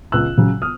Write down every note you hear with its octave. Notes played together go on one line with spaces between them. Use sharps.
C#2 E6 F#6
C#3 F#3
D#6 F6